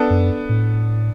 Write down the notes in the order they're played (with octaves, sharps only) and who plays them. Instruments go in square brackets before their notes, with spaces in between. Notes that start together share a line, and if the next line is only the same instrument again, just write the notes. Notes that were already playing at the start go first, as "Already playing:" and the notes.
Already playing: [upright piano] B3 D4 A4
[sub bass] F#2
A2